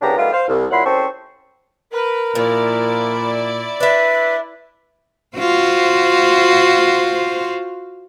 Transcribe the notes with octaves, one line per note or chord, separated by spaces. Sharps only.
C2 C#3 B3 D4 G4 A#5
D#3 G3 A3 B3 F4
C5 F5
C2
A#2 F#3 E4 F#5 B5 C6
C2 C4 C#4 A4 C5 C#6
A#4 B4
A#2 F3 E4 D5
D4 B4 E5
F4 F#4 C5